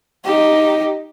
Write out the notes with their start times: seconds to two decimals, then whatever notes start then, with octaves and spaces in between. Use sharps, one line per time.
0.25 D#4 G4